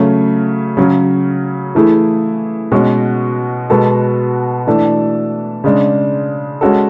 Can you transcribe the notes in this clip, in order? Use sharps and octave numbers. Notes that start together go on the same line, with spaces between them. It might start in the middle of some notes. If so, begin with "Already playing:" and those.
Already playing: C#3 F#3 A3 C#4
C#3 F#3 C#4 G#4
E3 A3 E4 G#4
B2 G#3 C#4 F#4
B2 G#3 B3 F#4 A4
E3 A3 D4 A4
C#3 G#3 D4
G#3 C#4 F#4 A4